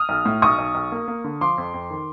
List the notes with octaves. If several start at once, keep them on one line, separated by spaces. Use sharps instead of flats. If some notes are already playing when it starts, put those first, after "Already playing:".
Already playing: D#6 F6
B1
A2
B1 C#6 D#6
B1
B1
A#3
A#3
D3
F3 C6 D6
F2
F2
D#3